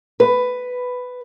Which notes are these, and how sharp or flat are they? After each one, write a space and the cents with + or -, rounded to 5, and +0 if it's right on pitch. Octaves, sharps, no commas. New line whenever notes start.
B4 +10